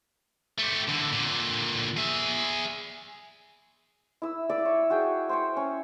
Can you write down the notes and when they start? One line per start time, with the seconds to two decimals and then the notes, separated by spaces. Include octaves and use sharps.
0.59 A3 G4
0.88 D3 E3
1.12 A#2 D3
1.97 G#4 E5
4.22 E4 E6
4.50 D5 E5 D6 E6
4.66 C#5
4.90 F#4 G#4 G5
5.29 C5 G5 C#6
5.56 C#4